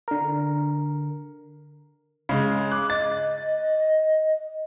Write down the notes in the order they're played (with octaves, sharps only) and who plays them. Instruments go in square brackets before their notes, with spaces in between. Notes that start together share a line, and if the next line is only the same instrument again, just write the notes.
[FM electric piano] D3 A#4
[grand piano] C#3 G#3
[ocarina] D6 [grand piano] F#6
[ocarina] D#5 [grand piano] A6